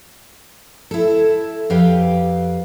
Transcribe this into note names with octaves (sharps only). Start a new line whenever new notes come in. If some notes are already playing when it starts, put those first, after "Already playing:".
E4 A4
F2 G4 B4 F5 G5